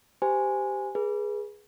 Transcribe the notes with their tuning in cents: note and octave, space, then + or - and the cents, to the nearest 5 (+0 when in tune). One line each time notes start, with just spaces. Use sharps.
G4 +0 C5 -25 G#5 +0
G#4 +0 B4 -30